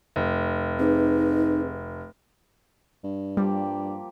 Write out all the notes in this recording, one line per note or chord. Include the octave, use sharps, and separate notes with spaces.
F1
C4 D#4 G#4 B4
G2
F3 G3 A#3 G4